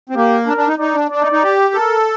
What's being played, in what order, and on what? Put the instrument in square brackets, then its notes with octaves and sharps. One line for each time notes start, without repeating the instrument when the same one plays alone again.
[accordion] C4
[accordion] A#3 [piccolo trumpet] G4
[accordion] D4 [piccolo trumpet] A#4
[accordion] D4
D#4
[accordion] D#4 [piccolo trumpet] D5
[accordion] D4
[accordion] D4 [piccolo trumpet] D5
[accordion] D#4
D#4
G4
[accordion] A4 [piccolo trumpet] A#4